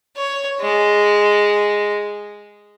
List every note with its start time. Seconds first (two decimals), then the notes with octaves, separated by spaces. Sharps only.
0.17 C#5
0.61 G#3